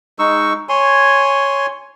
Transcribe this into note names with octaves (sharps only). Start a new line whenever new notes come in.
G#3 D#4 C#6 E6
C#5 G#5 C6